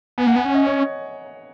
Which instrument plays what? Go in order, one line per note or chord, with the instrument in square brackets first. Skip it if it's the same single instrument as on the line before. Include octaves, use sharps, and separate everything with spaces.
[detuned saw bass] B3 [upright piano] G#5
[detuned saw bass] A#3 [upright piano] F#5
[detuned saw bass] B3 [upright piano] G#5
[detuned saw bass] C#4 [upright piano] F#5
[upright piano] D#5
C#5